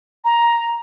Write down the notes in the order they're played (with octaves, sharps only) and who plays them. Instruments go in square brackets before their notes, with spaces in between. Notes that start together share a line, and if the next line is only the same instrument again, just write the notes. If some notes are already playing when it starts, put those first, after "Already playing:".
[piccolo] A#5